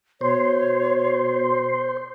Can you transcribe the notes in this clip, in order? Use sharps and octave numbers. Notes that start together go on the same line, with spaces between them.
B2 C5 C#5